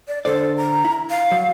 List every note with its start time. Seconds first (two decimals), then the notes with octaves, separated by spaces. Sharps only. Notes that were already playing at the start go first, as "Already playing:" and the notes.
0.08 D5
0.25 D3 A4 C5 D5
0.57 A#5
0.85 E4
1.10 F5
1.31 F#3